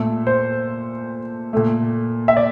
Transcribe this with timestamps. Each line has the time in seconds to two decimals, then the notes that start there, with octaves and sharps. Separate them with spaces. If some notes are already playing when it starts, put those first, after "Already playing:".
Already playing: A#2 A3 A4
0.27 C5
1.53 A#2 A3
2.28 E5
2.37 D5